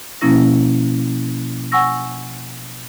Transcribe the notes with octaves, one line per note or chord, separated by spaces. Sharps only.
B2 F3 A#3 C#4 E4 A#6
F#5 G#5 C#6 E6 A#6